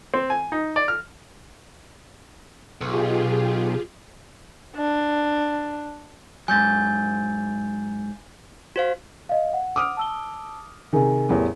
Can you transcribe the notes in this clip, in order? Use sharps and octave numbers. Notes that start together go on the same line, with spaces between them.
C4
G#5
D#4
D5
F6
B1 F4 G4 G#4
D4
G#2 F#3 G#5 G6 A6
F#4 C5 F5
D#5 F5
F#5
D6 D#6 F6
A5 E6 G7
C3 D#3 G#4 A#4 G#5
A1 E2 G3